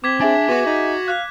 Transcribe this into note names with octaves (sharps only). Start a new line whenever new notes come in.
C4 D6 G#6 B6
D4 G#4 E5 G#5
B3 F#4 F#5
D#4
F5 F#6